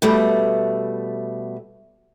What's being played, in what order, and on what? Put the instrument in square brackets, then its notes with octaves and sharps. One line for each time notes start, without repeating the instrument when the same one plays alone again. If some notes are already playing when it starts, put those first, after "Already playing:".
[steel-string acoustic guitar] B2 G3 A3